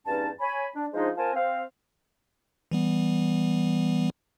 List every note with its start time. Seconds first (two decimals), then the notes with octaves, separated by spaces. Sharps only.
0.08 E2 G2 C#4 D#4 A5
0.40 C#5 G#5 B5
0.75 D4
0.94 F3 G#3 D4 D#4 G#4 C5
1.17 C4 F4 A#4 C5 G#5 A5
1.35 C4 F5
2.71 E3 G3 B3